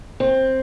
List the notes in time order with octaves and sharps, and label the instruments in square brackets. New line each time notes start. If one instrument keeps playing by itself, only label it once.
[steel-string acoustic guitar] C4